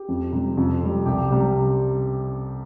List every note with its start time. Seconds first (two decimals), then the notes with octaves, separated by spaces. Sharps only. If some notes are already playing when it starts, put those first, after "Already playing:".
Already playing: G4
0.08 F2
0.32 C3 G3
0.57 F2
0.82 C3 G3
1.05 C2 G4
1.30 C3 G3